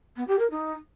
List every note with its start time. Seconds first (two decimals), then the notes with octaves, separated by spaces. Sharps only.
0.16 B3
0.27 G4
0.38 A#4
0.50 D#4